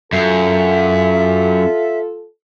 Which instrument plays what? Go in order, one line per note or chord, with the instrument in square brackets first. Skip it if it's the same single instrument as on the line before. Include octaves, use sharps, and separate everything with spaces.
[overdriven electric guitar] F#2 [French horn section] F4 A4 [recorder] E5